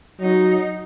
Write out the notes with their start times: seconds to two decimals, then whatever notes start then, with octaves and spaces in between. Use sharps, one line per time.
0.21 F#3 D#4